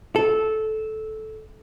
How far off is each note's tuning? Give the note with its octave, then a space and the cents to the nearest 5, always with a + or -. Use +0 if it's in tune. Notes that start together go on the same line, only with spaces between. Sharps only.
A4 -15